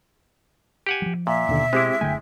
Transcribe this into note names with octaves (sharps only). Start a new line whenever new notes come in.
G4 F#5 G#5
F3 F#3
A#2 E5
D#2 B2 D3
G#3 C4 E4 G4 D6
F#1 D3 A3 G5 G#5